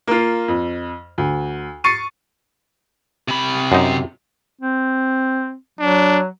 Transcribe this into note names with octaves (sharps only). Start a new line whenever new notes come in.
A#3 F4
F2
D2
C#6 A6 C7 C#7 D#7
C3 B5
F#2 D#4
C4
F#3 D4